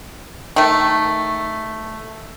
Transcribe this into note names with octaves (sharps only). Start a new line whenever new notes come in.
D#3 A3